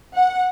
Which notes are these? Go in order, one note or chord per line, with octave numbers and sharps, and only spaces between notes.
F#5